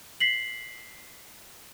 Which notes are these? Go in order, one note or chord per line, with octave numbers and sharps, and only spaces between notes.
B6 C7 F#7